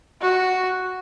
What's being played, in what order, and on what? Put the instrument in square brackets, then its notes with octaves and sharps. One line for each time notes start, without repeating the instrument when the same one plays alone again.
[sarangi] F#4